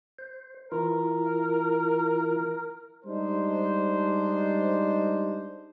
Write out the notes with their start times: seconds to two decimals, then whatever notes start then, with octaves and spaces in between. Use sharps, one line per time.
0.19 C5
0.72 E3 E4 F4 A#4
3.05 G3 G#3 D4 D#4 C5